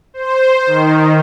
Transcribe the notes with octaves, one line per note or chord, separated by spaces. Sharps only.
C5
D#3